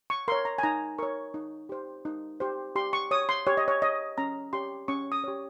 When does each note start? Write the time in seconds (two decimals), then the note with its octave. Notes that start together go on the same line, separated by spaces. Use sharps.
0.10 C#6
0.28 A#4 C6
0.32 C#5
0.45 A#5
0.58 G#5
0.63 D#4 A#5
0.98 A#4 C#5 C#6
1.34 D#4
1.69 G4 C5
2.05 D#4
2.40 G4 C5
2.76 G4 C6
2.93 C#6
3.11 C#5 D#6
3.29 C6
3.47 G4 C#5
3.57 D#5
3.68 C#5
3.82 C#5 D#5
4.18 C#4 A#5
4.53 G4 C#5 C6
4.88 C#4 C#6
5.12 D#6
5.24 G4 C#5